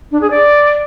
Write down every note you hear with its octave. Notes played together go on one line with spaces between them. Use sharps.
D4
G#4
D5